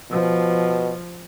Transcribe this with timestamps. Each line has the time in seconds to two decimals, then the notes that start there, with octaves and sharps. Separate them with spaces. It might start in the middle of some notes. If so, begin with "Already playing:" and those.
0.11 B2 F3